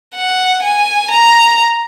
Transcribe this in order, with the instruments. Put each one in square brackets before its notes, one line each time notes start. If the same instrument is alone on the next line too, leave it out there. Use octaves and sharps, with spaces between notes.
[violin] F#5
G#5
A#5